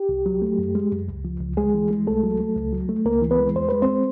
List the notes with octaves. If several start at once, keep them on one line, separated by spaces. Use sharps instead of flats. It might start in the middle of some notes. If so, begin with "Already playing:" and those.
Already playing: G4
C2
F#3
A3
F#2
G#3
F#2
C#2
F3
C#2
D2 G#3 G#4
E3
G#3
C2 A3 A4
F#3
A3
C#2
F#3
A3
C#2 A#3 A#4
E3
B3 B4
G#3
E2 C5
G#3 B4
C4 C5